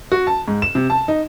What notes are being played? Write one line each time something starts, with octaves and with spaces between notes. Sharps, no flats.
F#4
A5
G#2
E7
C3
A5
D#4